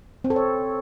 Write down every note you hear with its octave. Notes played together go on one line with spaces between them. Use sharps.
C4
A4
C#5